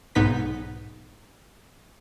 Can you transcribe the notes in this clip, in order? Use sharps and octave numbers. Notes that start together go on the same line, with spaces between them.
B1 G#2 B3 D#4 B4 B6